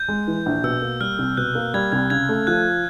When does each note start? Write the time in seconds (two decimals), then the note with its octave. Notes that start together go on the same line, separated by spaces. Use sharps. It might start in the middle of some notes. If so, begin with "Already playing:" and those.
Already playing: G6
0.08 G#3
0.28 E3
0.46 A#1
0.64 B2 E6
0.82 A#3
1.00 G3 F6
1.19 C2
1.37 B2 F#6
1.55 A#3
1.74 G3 G#6
1.92 C2 G#6
2.10 C#3 G#6
2.29 A3
2.47 F3 F#6